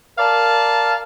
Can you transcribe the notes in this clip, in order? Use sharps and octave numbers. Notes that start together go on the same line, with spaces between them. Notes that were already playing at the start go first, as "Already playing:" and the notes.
A#4 D5 F5 A5